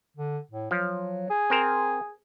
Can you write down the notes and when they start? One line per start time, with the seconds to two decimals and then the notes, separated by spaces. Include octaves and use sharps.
0.17 D3
0.51 A2
0.71 F3 F#3
1.30 G#4
1.50 C4 A#4 C5